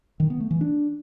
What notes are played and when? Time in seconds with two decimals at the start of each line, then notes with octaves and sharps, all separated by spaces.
0.20 D#3
0.30 B3
0.40 A3
0.51 E3
0.61 D4